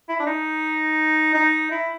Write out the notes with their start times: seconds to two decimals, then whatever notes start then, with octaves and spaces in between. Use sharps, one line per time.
0.09 E4
0.19 D4
0.27 D#4
1.34 D#4
1.71 E4